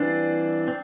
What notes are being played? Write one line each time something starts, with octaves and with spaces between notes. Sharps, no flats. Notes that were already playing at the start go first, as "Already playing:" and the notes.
Already playing: E3 G3 C4 D4 F4 C5 D5
C4